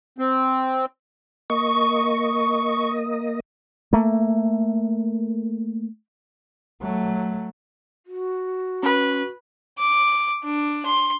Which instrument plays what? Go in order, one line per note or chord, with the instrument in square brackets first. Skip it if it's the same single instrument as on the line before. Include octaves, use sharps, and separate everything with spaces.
[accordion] C4
[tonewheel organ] A#3 D#5 [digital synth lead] C#6
[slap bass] A3 A#3
[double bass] F#3 A3
[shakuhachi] F#4
[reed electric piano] C#4 [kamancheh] B4
[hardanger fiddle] D6
D4
C6